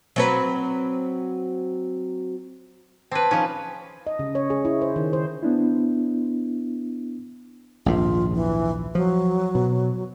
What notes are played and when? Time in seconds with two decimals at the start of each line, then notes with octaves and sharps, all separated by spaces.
0.16 F#3 C4 B4
3.11 C4 B4 A5 D6 G#6
3.31 F3 C#4 D#4 G#4 B4
4.07 D#5
4.19 C#3
4.35 C#5
4.50 G#4
4.65 E4
4.82 C5
4.96 D#3
5.13 C5
5.43 B3 D4 E4
7.86 A#1 D#2 G#2 F4
8.35 E3
8.95 F3 F#3
9.55 B2